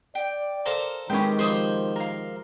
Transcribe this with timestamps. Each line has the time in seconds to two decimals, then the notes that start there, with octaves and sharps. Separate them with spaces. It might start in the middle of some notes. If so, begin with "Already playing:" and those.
0.15 D5 G5
0.66 A4 A#4 C5 F5
1.10 D#3 G#3 C4 C#4 G4 B4
1.39 F3 G4 C5 D#6
1.96 A#4 F5